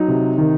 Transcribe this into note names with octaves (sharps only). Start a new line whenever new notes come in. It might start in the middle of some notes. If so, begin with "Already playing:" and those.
Already playing: F#3 D#4
C3
D#3